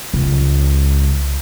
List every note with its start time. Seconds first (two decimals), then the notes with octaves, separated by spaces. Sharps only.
0.14 C#2